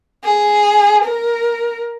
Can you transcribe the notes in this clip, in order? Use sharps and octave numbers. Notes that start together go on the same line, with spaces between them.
G#4
A#4